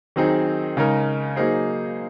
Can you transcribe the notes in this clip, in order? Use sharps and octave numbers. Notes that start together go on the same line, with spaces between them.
D#3 F#3 C4 D#4 G#4
C#3 G#3 D#4 A#4
F#3 A#3 D#4 G#4 C5